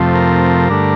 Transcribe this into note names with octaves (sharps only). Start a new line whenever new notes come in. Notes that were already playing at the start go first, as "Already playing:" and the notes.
Already playing: F2 C3 F3 A3
A#4
G2 D3 A3